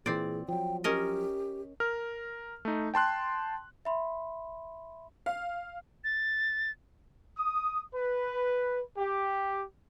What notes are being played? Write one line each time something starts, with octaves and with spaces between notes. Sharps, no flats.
A#2 E3 C4 G#4 D5
F3 F#3 G5
C#4 G4 A#4 D#5
A#4 F6
A3 D#4
G5 A5 C6 F#6
E5 B5 C6
F5
A6
D#6
B4
G4